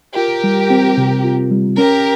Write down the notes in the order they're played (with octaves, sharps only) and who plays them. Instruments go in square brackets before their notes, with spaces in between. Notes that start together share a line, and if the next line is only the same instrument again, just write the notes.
[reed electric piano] F4 [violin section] G4 A#4
[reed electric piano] G3
C4
C3
F4
G3
[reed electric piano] C#4 [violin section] G4 A#4